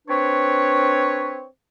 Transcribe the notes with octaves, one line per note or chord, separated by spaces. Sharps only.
C4 D4 B4 C#5